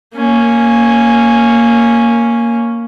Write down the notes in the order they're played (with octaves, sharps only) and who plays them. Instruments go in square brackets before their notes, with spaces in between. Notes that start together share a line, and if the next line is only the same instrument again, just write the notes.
[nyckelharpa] A#3 C#4